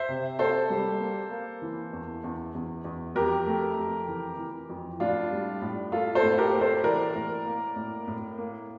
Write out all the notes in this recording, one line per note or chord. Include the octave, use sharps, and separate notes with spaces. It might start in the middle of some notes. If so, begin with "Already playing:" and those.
Already playing: C5 E5
C3
A#3 A4 C5
G3
A#3
A#3
E3
E2
E2
E2
E2
F2 G4 A#4
A3
F2
E3
E3
F2
A2 D4 F4
G3
A2
A#3 F4 A4
A4 C5
A2
G4 A#4
A#3
A4 C5
E3 A#4 D5
A2
A#3
A2
A2
A#3